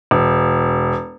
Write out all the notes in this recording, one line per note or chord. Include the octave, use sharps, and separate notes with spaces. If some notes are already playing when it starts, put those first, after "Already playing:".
E1